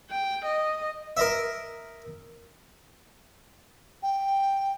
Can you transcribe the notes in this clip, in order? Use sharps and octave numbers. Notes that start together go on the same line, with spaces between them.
G5
D#5
A#4 D#5 E5
G5